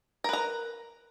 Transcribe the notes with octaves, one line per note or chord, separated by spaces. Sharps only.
A#4 B4 A#5